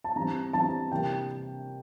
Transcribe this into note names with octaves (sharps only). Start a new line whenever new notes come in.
A5
E3 G3 C4 A#5
E3 G3 C4 A5
C3 E3 G3 A#3 G5